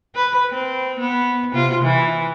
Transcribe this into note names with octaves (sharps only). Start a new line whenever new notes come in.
B4
C4
B3
C3 F4
E3